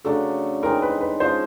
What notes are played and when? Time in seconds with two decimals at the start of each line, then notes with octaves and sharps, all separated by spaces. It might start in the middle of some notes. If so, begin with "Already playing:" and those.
0.05 C#3 F#3 A3 D4 A4
0.62 E3 G#3 C4 D#4 A#4
0.82 B4
1.01 B4
1.20 F3 G#3 C#4 F4 C5